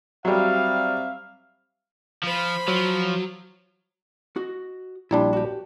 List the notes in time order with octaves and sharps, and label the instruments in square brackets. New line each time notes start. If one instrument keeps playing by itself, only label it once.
[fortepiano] F#3 G3 [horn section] C4 E5 F5
[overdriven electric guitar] F3 [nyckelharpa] C5 B5
[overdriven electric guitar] F3 [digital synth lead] F#3
[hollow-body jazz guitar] F#4 D#5
[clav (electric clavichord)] A#1 G3 D4 [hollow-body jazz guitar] E4 A#5 C6
[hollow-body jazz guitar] F#4 G4